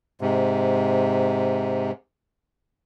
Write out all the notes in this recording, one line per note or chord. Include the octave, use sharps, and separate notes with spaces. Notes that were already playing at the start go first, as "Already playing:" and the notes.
G#2 C3